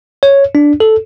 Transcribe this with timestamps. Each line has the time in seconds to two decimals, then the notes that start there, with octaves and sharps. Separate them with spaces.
0.23 C#5
0.55 D4
0.80 A4